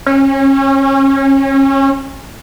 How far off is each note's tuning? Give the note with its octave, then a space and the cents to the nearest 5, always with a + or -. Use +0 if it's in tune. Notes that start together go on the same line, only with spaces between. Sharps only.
C#4 -30